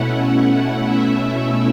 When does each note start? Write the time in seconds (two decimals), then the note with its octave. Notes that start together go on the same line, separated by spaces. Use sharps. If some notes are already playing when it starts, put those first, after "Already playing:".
Already playing: B2 A3 C#4 E4 F#5
0.85 B2 A3 C#4 E4 E5
1.21 E5